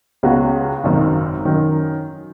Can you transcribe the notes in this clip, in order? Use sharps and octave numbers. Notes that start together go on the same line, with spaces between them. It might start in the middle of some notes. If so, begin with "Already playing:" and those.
C#2 C#3 B3 F#4
G#1 F#2 D#3
D#3 F#3 C#4